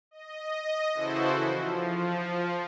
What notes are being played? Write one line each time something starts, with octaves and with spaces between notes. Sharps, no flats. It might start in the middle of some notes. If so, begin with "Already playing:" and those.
D#5
C#3 E3 E4 F#4 A4 C5
F3